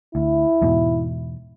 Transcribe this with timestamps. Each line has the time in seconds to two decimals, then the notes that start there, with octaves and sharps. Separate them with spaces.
0.15 D2 E4
0.62 E2 G#2 B2